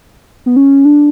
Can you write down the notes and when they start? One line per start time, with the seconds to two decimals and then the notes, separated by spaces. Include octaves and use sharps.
0.46 B3
0.56 C#4
0.85 D4